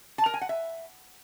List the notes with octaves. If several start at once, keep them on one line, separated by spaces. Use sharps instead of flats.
A5
A#4
G#5
F#5
E5